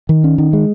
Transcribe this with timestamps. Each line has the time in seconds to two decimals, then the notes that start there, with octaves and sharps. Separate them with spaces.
0.09 D#3
0.24 C#4
0.38 D#3
0.53 G#3